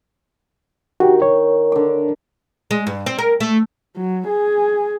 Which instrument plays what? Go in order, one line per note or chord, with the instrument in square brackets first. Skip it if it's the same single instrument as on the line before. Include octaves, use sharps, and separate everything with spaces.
[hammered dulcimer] D#3 [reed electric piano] F#4 G4
[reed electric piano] C#5
[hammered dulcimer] D3 D6
[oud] G#3
G2
C4
A#4
A3
[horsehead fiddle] F#3
G#4